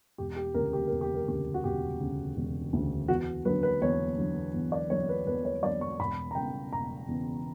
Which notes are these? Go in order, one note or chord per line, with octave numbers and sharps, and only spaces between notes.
E1 G4
G4
D2 C#3 A#4
G4
E1 A#4
G4
A#4
D2 C#3 G4
F#4
E1 G4
D2 C#3
E1
D2 C#3
E2 F#4
D3 F#3 B4
B4
E2 C#5
D3 F#3
E2
D5
D3 F#3 C#5
B4
E2 B4
C#5
D3 F#3 D5
C#6
E1 B5
A#5
E2 C#3 G5
E1 A#5
E2 C#3